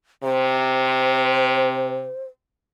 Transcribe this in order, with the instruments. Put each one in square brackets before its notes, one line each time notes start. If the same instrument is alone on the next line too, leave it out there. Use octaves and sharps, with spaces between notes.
[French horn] C3 [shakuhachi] C5